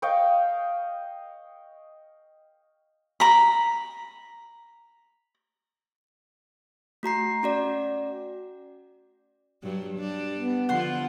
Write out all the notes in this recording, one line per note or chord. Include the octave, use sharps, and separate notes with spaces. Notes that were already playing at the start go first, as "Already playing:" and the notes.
D#5 F5 G5 C#6
A#5 B5
A3 F#4 A#5 C7
C#4 F#4 D5
G2 F#3
G3 D4
B3
D3 F3 F4 F#5 C6